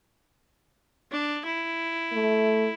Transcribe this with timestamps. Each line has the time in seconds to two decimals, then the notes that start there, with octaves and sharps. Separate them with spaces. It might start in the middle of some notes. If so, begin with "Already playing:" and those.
1.12 D4
1.45 E4
2.13 A3